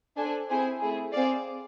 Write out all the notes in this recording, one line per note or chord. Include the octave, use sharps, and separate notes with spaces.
D4 A4 C5 G#5
C4 E4 G#4 C5 G#5
A3 C4 E4 G#4
C4 G#4 D5 F5